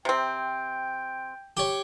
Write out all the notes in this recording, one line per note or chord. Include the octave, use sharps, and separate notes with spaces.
C3 C4 G5
G4 C#5